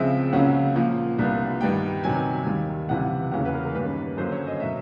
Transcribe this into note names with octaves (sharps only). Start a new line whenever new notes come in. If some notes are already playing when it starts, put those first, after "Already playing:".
Already playing: C#2 C#3 F3 G#3 C4 E5
C#2 C#3 F#3 A#3 C#4 F#5
A#2 F3 A#3
C2 A#2 G3 B3 D4
G2 D#3 G3 B3 G5
C3 D#3 F#3 G#5
D#2 D#3 G3
C#2 C3 E3 G3 F#5
E2 C#3 F#3 A#3 F#5
B4
A#4
A#4
G2 D#3 G3 A#3 C#4 B4
F#2 D3 F#3 A#3 C#4 C5
C#5
D#5
B2 F#3 E5